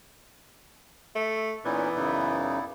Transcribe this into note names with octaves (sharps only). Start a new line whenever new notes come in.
A3
A#2 E3 B3 C#4 D#4 E4 D5
F#2 C#3 D#4